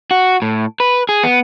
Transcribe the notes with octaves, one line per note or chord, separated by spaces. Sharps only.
F#4
A2
B4
G#4
B3